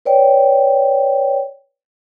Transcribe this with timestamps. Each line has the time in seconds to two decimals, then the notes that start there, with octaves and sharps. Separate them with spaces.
0.05 B4 C#5 D5 G5